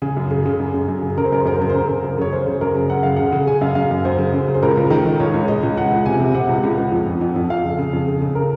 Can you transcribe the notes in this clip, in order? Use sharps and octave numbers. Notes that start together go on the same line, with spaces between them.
C#3 G#4
F#2
C#3
C#3
F#2
F#2
F#2
C#3
C#3 A#4
C5
F#2 A#4
C5
F#2 A#4
C5
C#3 A#4
C5
C#3 A#4
C#3
F#2
C#3 C#5
F#2 C5
C#3
F#2 A#4
C#3
F#2 F#5
C#3 F5
C#3 F#5
C#3
C#3 G#5
F#2 F5
F#2 F5
F#2
F#2 C5
C#3
F#2
C#3
C5
C#2 A#4
C#2
D#3
D#3
C#2 C#5
C#2
C#2 D#5
C#2
C#2 F#5
C#2
C3 G#5
C3
C3 F#5
C#2
C#2
C#2
F2
F2
F2
F2
F2 F5
C#3
C#3
F2
C#3
C#3
A#4